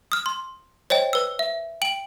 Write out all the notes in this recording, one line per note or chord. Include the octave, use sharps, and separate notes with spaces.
D#6 F6
C6
C5 C#5 D#5 G5
B4 E6
E5
G5 D7 F#7